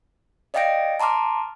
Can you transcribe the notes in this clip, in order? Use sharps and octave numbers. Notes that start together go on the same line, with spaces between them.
D5 D#5 F5 G5 A#6 D7
A5 A#5 C6 D6 F6